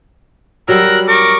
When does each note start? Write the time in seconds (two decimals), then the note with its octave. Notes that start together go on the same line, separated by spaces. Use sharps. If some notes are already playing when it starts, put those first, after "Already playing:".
0.69 F#3 G3 A#4 E6 F#6
1.08 A#4 C#6 D6